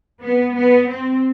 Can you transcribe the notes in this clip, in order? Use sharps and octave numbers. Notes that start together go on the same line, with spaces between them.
B3
B3
C4